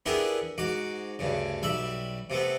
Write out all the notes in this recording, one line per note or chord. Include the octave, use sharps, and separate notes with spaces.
B3 D4 E4 G4 G#4 A#4
G#2 F#4 D6
D2 G2 C#3
B1 G3 E5 B5
C3 A3 B3